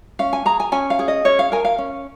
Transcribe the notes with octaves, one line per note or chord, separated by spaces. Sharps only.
C#4 F5
G#5
G#4 A#5
G#5
C#4 G#5
F5
G#4
D#5
C#4 C#5
F5
A#4 G#5
F5
C#4